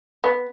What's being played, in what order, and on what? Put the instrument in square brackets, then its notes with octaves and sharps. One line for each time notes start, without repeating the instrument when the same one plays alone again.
[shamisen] B3